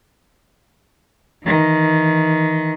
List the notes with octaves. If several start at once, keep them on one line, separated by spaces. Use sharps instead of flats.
D#3 E3